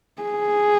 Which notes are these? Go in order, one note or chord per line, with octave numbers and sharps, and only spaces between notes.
G#4